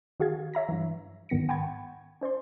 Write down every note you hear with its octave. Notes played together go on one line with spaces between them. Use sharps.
D#3 F#4 G#4 F5 F#5 G#6
C#5 E5 A#5 A#6
G2 E3
G#2 D#3 B3 A#6 C#7
F#5 G5 A5 B5 C#6 G#6
C#4 C5 D5 C6